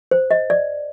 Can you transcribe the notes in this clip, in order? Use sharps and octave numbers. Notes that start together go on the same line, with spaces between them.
C5
D#5
D5